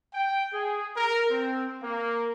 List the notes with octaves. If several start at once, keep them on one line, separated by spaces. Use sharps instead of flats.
G5
G#4
A#4
C4
A#3